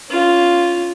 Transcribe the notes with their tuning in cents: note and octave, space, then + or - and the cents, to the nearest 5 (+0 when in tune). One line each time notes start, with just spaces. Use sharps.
C#4 +15 F4 +0